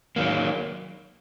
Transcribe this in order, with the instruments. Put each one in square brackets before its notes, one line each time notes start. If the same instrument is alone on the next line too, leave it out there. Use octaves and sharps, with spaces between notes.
[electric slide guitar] D#3 F#3 A#3